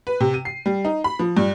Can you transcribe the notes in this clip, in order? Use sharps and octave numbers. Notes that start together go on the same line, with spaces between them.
B4
C3
D#7
C7
G3
D#4
B5
F3
G2